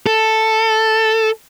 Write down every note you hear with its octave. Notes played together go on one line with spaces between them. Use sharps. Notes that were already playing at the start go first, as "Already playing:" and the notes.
A4